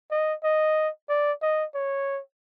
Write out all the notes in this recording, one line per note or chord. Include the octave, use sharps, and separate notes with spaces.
D#5
D#5
D5
D#5
C#5